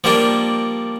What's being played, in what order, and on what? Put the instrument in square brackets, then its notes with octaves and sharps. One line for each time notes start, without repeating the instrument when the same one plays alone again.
[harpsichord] F3 G3 A#3 D4